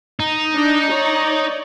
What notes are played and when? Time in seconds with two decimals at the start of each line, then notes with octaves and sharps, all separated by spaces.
0.20 D#4
0.57 D4
0.90 C#5 D5